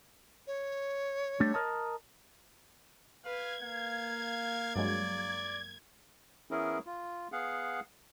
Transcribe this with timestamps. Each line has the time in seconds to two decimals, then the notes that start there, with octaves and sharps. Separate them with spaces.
0.47 C#5
1.40 G3 A3 D4
1.54 A#4 D#5 A5
3.25 B4 F5 G#6
3.63 A#3 F5
4.76 G2 F#3 G#3 D5
6.51 E3 B3 C#4 E4 G#4 A#4
6.86 F4
7.32 B3 G#4 F5 F#5